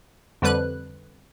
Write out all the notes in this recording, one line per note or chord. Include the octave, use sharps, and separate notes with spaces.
F2 D3 G3 B4 F#6